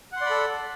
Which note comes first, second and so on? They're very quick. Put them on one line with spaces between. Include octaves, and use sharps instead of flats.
F#5 C6 D5 B5 A4